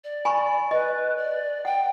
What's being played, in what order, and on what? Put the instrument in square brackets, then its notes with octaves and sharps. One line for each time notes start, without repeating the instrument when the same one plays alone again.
[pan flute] D5
[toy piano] G#5 B5 C#6
[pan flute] B4 [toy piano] D#5
[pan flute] D5
[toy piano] F#5 [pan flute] G5